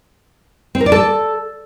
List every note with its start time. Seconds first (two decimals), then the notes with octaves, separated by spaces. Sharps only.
0.75 C4
0.80 A#4
0.86 D5
0.92 A4